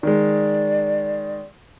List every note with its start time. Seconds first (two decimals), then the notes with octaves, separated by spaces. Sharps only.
0.03 D#3 G#3 D5